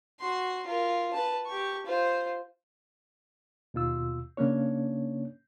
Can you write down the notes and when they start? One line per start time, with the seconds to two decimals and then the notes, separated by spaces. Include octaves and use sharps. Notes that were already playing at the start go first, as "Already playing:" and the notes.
0.20 F#4 C6
0.67 F4 A#4
1.13 B4 A5
1.46 G4 C#6
1.86 F4 C5
3.74 D#2 B2 F4 E6
4.37 C#3 A#3 C#4 D4 C#5